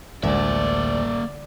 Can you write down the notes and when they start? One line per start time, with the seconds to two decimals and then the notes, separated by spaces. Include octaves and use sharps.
0.23 A1 D2 G#3 A#3 D4 D5 E5